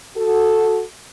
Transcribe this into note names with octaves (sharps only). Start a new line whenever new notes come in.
F#4 A4